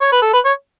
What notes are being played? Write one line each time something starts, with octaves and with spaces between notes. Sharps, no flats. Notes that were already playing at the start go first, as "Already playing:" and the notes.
C#5
B4
A4
B4
C#5